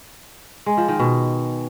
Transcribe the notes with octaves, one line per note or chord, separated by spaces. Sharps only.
G#3
F3
D#3
B2